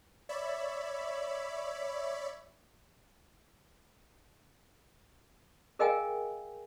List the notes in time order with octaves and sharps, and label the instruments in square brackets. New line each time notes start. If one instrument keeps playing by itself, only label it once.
[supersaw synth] C#5 D5 E5 B5
[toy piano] G#4 A#4 D#5 F5 G5 G#5